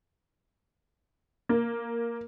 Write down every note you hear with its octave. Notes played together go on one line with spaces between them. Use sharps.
A#3